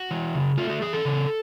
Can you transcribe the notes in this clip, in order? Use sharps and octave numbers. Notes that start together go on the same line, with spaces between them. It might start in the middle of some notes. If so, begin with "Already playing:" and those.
Already playing: F#4
E3
C#3
A3 F4
F#4
E3 G#4
A4
C#3